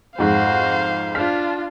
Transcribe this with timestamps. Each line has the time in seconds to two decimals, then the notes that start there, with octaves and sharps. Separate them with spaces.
0.18 F2 G#2 F#4 C5 F5
1.15 D4 F4 F6 B6